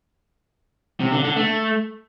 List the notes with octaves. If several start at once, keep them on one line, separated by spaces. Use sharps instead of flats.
C3
D3
D3
A3